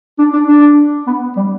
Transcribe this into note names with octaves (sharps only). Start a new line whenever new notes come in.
D4
D4
D4
B3
G3